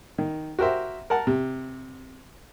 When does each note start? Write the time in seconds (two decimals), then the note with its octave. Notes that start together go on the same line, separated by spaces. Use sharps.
0.18 D#3
0.59 F#4 G4 A#4 C5 E5
1.10 A#4 F#5 A5
1.27 C3